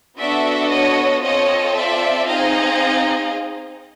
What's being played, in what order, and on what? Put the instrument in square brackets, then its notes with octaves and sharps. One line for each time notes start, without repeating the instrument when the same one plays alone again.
[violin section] B3 D4 F#4 A4 D5 E5
C#5 D#5
C4 F4 A4 C#5 D#5
D5 E5
C4 D#4 G#4 D#5 F5